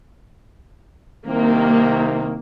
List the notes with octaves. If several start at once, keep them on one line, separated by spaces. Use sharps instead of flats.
C2 C3 D#3 A#3